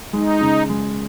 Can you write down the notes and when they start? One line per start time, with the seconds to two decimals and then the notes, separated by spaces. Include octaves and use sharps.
0.13 G#3 D#4
0.41 C#3
0.69 G#3